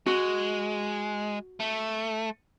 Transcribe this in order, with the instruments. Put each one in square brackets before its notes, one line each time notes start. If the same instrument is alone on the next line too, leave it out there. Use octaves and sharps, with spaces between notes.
[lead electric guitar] G#3 [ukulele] F#4
[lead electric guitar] A3